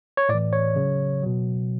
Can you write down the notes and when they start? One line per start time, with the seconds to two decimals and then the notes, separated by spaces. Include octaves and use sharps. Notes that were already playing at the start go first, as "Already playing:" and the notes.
0.17 C#5
0.29 A2 D5
0.34 E3
0.53 C#5
0.76 C#3 F#3
1.23 B2 F#3